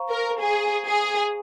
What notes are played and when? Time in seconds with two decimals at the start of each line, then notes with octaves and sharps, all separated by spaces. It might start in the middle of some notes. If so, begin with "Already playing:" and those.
Already playing: C5 F5 A#5 C#6
0.09 A#4
0.40 G#4
0.87 G#4